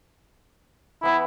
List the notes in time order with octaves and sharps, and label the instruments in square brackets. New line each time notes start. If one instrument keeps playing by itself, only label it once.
[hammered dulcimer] E3 B3 B5 [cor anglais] E4